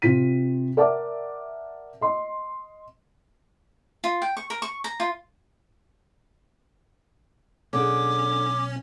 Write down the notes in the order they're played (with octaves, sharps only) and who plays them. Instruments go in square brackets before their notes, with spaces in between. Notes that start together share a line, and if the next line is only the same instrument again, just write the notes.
[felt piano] C3 F4 B6 D#7
A#4 D5 E5 F#5 A5 D6
D#5 C6
[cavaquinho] F4
G5
C#6
A#4
C#6
A#5
F4
[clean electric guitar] B1 [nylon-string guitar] D3 D4 G#4 [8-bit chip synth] C#4 [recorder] D6